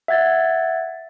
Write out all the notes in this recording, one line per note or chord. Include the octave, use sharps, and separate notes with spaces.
E5 F#5 G#6 A6